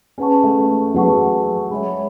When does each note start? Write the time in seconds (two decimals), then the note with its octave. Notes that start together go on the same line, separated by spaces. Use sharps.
0.18 C#4 G#4 B4 F#5 A5 C#6
0.44 A3
0.94 F#3 G#4 B4 F#5 A5 C#6
1.71 G#3 C#5 E5 B5